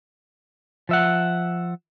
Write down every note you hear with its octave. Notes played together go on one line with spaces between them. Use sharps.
F3 E5 F#5